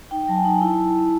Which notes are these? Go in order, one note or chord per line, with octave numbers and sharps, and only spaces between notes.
D#4 G5
F#3 A5
G#5
D#4
E4 A5